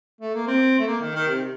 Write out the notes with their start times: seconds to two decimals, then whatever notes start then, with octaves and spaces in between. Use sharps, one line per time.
0.21 A3
0.34 A#3
0.47 C4
0.79 A3
0.87 A#3
1.01 D#3
1.15 D#3
1.28 C3